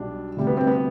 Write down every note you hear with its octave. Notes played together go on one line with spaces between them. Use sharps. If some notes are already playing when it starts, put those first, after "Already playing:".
Already playing: B1 B2 G3 D4
D2 C3 G3
B3
C4
B3